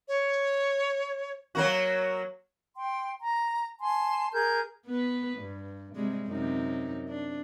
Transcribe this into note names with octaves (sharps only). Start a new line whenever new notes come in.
C#5
F#3 A#3 F#4
G5 C6
A#5
G#5 A5 C6
G#4 A#4 G6
B3 B4
G2
C3 G3 G#3
F#2 C3 D#4
D4